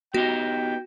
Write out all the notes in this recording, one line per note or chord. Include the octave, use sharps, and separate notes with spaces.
B3 D#4 F#4 G4 G5